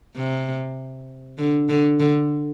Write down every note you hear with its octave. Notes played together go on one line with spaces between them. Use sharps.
C3
D3
D3
D3